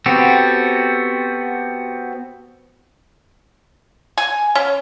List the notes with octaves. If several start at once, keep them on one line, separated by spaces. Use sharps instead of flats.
B3 C4 F#4 G4 A4
G#5
C#4